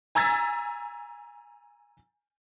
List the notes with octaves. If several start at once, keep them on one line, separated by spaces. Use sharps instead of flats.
G#5 A#5 E6 G#6 A6 B6